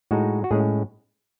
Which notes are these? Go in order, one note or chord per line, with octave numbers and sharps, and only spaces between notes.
A2 G#3 D#4 F#4
F#4
A2 G#3 C#4 G#4